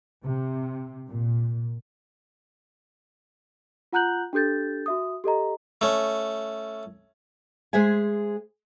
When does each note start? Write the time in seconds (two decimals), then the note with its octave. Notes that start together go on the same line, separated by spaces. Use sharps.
0.23 C3
1.07 A#2
3.93 F4 F#5 A#5 F#6 G6 F#7
4.33 D4 G4 A4 G6 A6
4.86 F#4 E5 D#6
5.24 G4 A4 D#5 A#5
5.81 A3 C#4
7.73 G#3 G#4 C5 E5 G#5